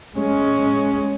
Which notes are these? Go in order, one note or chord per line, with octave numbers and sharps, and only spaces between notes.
G#3 C#4